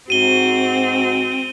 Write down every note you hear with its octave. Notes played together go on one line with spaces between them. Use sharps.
G#2 C4 F#4 D#7 G7